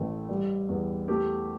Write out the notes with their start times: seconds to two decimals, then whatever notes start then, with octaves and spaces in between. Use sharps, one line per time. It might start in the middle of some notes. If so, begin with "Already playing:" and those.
Already playing: A1 A3
0.29 G3
0.69 E2
1.08 A3 G4